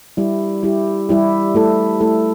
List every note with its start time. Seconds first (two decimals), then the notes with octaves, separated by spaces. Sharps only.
0.17 G3 E4 G4
0.63 G3 E4 G4
1.09 G3 E4 G4
1.55 A3 E4 A4
2.01 A3 E4 A4